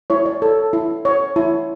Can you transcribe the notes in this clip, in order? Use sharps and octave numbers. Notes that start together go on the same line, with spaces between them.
E4 C#5
D5
A4
E4
C#5
E4